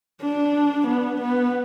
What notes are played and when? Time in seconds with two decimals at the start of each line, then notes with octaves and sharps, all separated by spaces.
0.22 D4
0.87 B3
1.21 B3